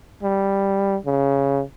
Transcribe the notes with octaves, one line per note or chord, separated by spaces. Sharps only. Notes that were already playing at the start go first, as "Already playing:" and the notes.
G3
C#3